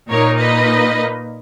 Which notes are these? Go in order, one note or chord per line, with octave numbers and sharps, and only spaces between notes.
A#2 A#3 D#4 A#4 C#5
B4 D#5